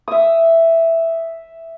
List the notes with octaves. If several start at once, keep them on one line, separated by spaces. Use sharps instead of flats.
E5 D#6